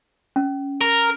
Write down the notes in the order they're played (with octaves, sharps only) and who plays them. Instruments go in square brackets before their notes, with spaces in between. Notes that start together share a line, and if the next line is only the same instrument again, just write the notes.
[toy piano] C#4
[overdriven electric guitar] A#4